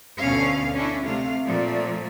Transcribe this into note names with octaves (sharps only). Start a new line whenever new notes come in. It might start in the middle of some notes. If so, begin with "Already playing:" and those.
D2 B2 C#4 F5
C#4 D4 E4
C3 A3 F5
A#2 F3 A3 D5